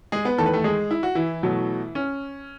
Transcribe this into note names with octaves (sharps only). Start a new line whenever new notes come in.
G#3 G#4
B3 B4
E2 D#3 A3 A4
B4
A3 A4
G#3 G#4
E4
F#4
E3 E4
B2 F#3 A3
C#4